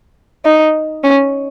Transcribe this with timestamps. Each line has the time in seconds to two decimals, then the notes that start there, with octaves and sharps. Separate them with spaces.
0.45 D#4
1.04 C#4